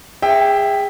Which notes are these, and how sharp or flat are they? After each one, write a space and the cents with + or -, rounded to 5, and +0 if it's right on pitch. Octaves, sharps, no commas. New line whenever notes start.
G#4 -25 E5 +0 G5 +0